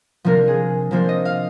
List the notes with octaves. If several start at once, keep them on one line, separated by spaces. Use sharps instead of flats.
C3 F3 A#3 D4 A#4
G#4
C3 F3 A#3 D4 C5
D#5
F5